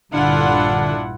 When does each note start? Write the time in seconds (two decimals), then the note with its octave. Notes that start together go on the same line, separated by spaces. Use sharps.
0.13 A#1 G2 D3 D4 E4 F4 F#5